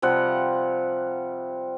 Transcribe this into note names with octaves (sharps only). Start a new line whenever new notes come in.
C3 F3 G3 F#5